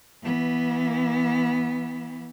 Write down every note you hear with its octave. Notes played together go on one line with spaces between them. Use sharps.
E3 B3